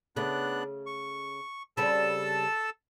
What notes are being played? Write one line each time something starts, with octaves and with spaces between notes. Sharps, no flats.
C#3 A3 B3 D4 F#6
C#6
C#3 G3 C4 A4 A5 E6